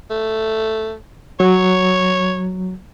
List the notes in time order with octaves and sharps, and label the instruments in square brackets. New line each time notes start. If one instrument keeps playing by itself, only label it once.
[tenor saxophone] A3
[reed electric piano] F#3 [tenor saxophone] C#5